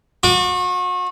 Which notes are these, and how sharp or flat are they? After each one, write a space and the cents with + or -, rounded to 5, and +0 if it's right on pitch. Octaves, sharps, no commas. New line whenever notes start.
F#4 -35 D6 +0